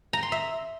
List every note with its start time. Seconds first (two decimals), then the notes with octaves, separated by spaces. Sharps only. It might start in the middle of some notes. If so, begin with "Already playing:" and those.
0.13 A#5
0.23 C6
0.32 E5